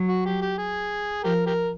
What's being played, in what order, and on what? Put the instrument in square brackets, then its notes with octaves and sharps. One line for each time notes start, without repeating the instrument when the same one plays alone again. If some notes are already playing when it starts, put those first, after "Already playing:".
Already playing: [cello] F#3
[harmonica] F#4
G4
G4
G#4
[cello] F3 [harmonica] G4 A#4
[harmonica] G4 A#4